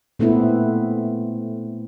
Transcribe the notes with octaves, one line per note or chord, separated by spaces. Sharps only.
A#2 A3 B3 C4 E4